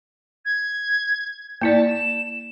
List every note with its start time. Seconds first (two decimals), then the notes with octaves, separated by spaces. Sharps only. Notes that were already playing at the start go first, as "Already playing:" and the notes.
0.45 G#6
1.62 A#3 E4 D5 A5
1.88 E7